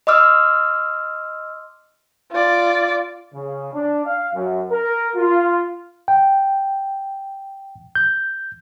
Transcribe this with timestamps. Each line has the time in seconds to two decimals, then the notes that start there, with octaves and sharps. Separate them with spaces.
0.07 D#5 C6 D6 E6 F6
2.32 F4 D5
3.34 C#3
3.74 D4
4.05 F5
4.34 F#2
4.71 A#4
5.16 F4
6.08 G5
7.95 G6